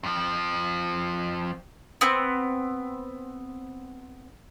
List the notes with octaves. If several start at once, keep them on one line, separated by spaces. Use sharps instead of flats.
F2 F3
B3 C4